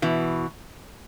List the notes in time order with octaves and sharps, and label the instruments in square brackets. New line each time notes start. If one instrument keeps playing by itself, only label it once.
[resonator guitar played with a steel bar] B2 E3